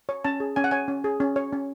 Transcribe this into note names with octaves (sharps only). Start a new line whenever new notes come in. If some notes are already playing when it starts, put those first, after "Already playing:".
C#5
C#4 A5
G#4
C#4 G#5
F#5
C#5 G#5
C#4
G#4
C#4
C#5
C#4